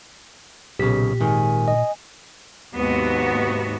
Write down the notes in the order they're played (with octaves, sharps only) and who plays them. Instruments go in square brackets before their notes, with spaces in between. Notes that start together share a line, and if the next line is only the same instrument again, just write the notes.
[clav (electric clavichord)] B1 C#3 [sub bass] A#2 [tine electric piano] G4 B6
[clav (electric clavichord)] G#1 D#3 [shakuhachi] G#5
[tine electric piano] D#5
[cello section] D#2 G#2 C3 B3 F#4